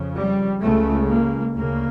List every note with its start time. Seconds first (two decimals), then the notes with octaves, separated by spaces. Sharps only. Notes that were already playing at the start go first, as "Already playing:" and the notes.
Already playing: F2 C#3
0.15 G3
0.61 C#2 C#3 A3
1.07 A#3
1.54 D2 C#3 A#3